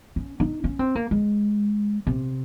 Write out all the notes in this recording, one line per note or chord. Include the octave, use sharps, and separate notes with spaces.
C#4
D#4
C#4
C4
A#3
G#3
C3